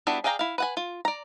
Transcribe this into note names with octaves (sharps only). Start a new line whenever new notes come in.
G3 B3 D4 E4 F#4
G#4 D5 F5 G5 A#5
E4 F5
B4 F#5 G#5
F4
D5 A#5